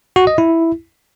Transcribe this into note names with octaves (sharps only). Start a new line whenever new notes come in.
F#4
D#5
E4